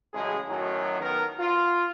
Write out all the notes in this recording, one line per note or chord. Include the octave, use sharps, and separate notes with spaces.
A1 C#3 F#3 G#3 G#4
F#2 A2 D#3 F#3
D#3 B3 A#4
F4